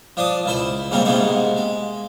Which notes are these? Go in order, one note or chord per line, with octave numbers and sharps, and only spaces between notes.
F3 D4 D6 D#6
C#2 E4 C5
G#2 C#3 G3 A#3 C4 D#4
G#2 C3 G#3 A#3 B3 D#4
G#3